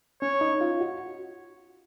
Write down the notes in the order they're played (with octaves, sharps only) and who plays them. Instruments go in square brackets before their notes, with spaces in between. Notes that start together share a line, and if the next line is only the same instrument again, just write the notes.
[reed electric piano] C#4 [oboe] C#5
[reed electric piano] D#4
F4
F#4